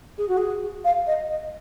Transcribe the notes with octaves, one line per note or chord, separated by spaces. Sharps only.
G#4
F#4
G#4
F5
D#5
D#5